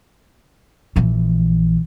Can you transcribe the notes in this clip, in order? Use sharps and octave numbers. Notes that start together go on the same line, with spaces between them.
A#1 E3